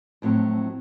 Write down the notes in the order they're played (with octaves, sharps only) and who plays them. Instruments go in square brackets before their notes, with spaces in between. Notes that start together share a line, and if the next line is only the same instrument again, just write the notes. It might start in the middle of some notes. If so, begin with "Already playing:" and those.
[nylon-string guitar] F2 A2 F#3 C4